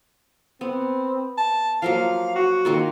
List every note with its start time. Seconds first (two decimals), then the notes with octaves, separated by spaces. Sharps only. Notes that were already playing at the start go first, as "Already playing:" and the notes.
0.61 B3 C4
1.38 A5
1.82 F3 F#3 A#3 F5
2.36 F#4
2.65 D#3 A#3 F4